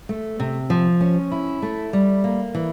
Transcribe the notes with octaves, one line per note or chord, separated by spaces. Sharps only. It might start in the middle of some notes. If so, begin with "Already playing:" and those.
A3
C3
F3
C#4
E4
A3
G3
A#3
E3